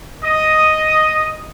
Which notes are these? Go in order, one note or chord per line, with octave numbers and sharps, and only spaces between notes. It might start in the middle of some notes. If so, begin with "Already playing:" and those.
D#5 D#6